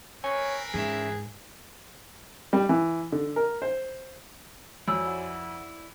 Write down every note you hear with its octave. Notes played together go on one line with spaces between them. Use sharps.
C4 A#4 B4 C#5 G#5
G#2 E3 C#4 G#4 E5
G3
E3
D3
A#4
C5
F2 E4 F#4 C#5 D5 G#5 E6
F#5